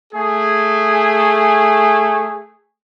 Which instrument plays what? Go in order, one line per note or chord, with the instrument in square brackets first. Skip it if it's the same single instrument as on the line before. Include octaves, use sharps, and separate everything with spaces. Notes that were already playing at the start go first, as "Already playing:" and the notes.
[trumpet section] A3 G#4